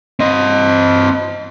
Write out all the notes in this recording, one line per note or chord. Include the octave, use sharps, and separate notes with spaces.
C4 D#5